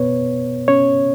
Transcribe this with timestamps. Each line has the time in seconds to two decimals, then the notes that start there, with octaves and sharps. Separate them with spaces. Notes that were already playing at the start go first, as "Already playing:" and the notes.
Already playing: B2 B3 B4 C#5
0.68 C#4 C#5